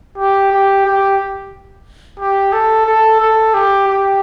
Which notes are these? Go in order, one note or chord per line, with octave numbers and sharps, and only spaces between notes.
G4
G4
G4
G4
A4
A4
A4
G4
G4